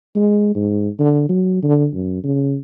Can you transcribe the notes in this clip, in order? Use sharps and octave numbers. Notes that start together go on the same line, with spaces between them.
G#3
G#2
D3
F#3
D3
F#2
C#3